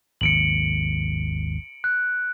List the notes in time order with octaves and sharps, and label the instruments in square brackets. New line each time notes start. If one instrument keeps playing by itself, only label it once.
[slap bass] G#1 D#2 [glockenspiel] C#7 D7 F#7
[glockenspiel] F#6